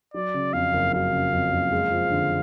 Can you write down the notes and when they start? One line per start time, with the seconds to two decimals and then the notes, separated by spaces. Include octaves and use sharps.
0.14 F#3 D5
0.34 C#3
0.53 F2 F5
0.73 F#1
0.93 F#3 F5
1.13 C#3
1.32 F2
1.52 F#1
1.72 G#3
1.91 F3
2.11 D3